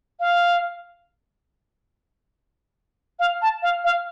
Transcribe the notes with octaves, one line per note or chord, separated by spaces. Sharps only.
F5
F5
A5
F5
F5